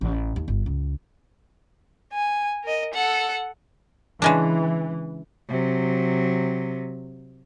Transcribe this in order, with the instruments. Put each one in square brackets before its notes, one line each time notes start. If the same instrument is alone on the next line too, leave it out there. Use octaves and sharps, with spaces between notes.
[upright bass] A1
D#2
G1
C#2
[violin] G#5
A#4 D#5
A4 F#5
[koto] C#3 G#3 D4 [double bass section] E3
[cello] C3 F#3